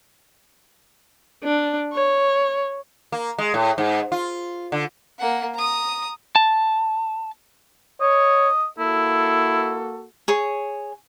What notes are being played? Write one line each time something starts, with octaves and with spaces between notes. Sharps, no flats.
D4
C#5
A#3
G#3
A2
G#2
F4
D3
A#3 F#5
A#5 D#6
A5
C#5 D#5
A#3 E4 F#4 A4
G#4 C#5